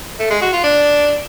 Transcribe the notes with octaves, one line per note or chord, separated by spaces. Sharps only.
A3
G#3
F#4
F4
D4